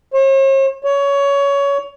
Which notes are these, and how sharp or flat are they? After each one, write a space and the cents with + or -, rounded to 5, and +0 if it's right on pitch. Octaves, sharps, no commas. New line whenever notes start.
C#5 -45
C#5 +20